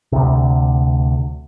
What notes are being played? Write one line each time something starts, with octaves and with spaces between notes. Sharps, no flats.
D2 C3